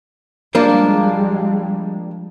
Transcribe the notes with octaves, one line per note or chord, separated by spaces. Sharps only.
F3 G3 G#3 A#3 D4